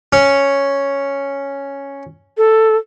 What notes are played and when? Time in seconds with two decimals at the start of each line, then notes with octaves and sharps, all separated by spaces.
0.13 C#4
2.38 A4